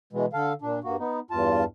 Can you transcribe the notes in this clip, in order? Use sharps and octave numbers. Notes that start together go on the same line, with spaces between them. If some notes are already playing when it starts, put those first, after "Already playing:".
B2 E3 G#3
D3 A4 F5
A#2 D4
G2 A#3 F#4
B3 D#4
E2 G2 F4 A5